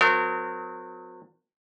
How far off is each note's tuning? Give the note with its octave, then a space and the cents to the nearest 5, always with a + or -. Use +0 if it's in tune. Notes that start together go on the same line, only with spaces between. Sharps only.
F#3 -35 C4 -45 A#4 -30